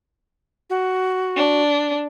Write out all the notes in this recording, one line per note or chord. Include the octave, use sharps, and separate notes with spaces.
F#4
D4